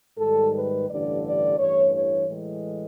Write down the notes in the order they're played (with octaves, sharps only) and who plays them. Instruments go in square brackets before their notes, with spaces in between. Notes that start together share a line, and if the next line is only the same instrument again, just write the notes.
[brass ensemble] G#2 D#3 G3 A4
B4
A1 G2 D3 D5
D5
A1 G2 E3 A3 C#5
C#5
A2 E3 G#3